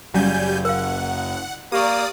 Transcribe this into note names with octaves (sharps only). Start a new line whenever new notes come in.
F#1 D#2 F#3 G3 C#4 F5 G#5 G6
A#4 F5 F#5
A#3 G4 D5 A#5 C#6 D#6